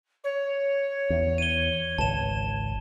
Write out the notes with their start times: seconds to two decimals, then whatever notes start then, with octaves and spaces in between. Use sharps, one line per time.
0.24 C#5
1.10 E2
1.38 D#7 G7
1.98 G#1 C#2 A5 E7